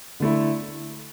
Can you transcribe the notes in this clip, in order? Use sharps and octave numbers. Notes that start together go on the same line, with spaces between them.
D3 A3 E4